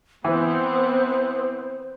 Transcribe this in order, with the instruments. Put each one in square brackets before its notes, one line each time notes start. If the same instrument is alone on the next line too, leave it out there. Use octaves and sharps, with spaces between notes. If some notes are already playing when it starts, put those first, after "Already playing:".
[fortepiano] E3 [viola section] B3 C4 [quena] C5